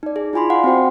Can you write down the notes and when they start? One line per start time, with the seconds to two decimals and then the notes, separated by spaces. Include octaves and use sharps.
0.03 D#4 D5
0.16 G#4 D5
0.33 E4 F4 G#5 B5 C6
0.50 F5 F#5 C6
0.64 C4 F#4 C5 G5